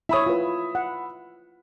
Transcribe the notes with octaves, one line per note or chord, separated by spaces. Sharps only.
E4 C#5 E5 B5 D#6
F4 B4
F#5